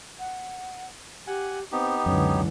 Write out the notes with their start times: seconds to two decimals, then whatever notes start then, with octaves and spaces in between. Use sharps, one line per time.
0.19 F#5
1.27 G4 F#5 G#5
1.72 B3 C4 D#4 G4
2.06 C#2 F#2 D3 E3 C#5